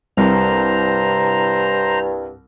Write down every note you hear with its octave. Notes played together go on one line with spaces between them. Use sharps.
C2 G2 C5 A#5